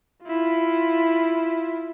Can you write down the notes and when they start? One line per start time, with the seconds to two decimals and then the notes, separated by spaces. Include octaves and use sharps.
0.24 E4 F4